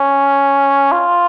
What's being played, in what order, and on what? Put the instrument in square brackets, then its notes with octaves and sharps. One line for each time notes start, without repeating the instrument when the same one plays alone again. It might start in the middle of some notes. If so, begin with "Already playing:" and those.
Already playing: [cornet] C#4
F4